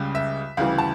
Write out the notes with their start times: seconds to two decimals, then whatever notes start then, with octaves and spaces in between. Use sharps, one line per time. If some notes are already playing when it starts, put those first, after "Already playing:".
Already playing: C#2 C#3 G3
0.15 E5
0.57 D2 C#3 E3 G3 F5
0.78 A5